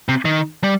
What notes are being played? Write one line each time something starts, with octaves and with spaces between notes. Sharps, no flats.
C3
D#3
G3